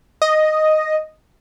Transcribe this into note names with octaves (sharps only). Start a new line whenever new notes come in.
D#5